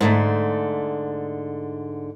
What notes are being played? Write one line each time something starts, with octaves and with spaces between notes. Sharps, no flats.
G#2 D3 A3